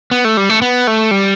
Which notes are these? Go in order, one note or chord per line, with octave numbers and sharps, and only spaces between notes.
B3
A3
G3
A3
B3
A3
G3